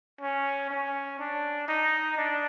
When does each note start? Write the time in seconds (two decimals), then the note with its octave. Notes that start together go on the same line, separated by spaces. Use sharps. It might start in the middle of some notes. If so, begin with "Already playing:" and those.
0.22 C#4
0.71 C#4
1.19 D4
1.68 D#4
2.17 D4